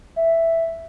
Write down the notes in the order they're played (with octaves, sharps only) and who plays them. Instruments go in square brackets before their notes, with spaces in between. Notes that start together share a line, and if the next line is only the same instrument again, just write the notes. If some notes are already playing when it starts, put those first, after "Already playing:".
[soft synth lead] E5